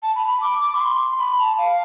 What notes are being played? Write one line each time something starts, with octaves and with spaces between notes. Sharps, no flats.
A5
B5
B5
D6
D6
B5
C6
B5
A5
F5